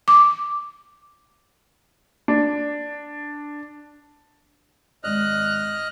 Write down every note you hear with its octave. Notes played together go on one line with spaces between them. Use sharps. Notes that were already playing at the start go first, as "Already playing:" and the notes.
D6
D4
G#1 G#2 D5 D#5 F6 F#6